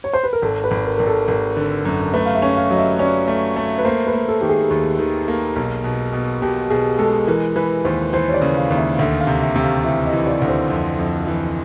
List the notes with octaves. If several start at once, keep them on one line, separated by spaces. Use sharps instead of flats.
C#5
C5
B4
A#4
G#1 A4
B4
G#1
A#4
G#1 A#4
A4
G#1 A#4
D3
F#2
A3 B4
F5
E5
C#4
F5
F#3 D#5
E5
C#4 D5
A3
A3
B4
A#3 C5
B4
A#3
A4
D#3 G4
G#4
D#2
D#3
A#3
B1
B2
B2
B2 G4
B2 G#4
G#3 A4
E3 A#4
E3 B4
D#2 C5
E3 C5
C#5
D5
C#3
F5
D#2
E5
D2 E5
F5
C3
E5
C3
F5
E3 E5
D#5
E3
D5
D2
C5
F2
F2
E3